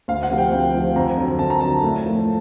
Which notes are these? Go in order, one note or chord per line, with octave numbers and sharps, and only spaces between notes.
D2 F5
F#5
C3 F3
G5
D2
C3 F3
F2 A#5
D3 F#3
F2 A5
A#5
D3 F#3 A5
A2
F3 A3